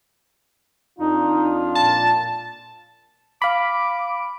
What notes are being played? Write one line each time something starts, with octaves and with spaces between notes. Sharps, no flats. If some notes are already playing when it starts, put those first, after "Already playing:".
F2 D4 D#4 F4
A#2 A5
F5 B5 D6